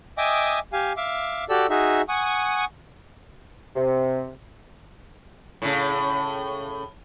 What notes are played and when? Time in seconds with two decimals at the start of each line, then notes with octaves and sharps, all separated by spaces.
0.18 D#5 E5 G5 G#5 D6 D#6
0.73 G4 F5 G#5
0.97 E5 F5 D6
1.49 F#4 G4 A4 D5 E6
1.70 D#4 F#4 G#4 E5
2.09 F#5 G#5 C#6 D#6
3.76 C3
5.62 A2 C#3